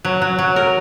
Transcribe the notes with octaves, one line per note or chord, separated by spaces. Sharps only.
F#3
F#3
F#3
A#4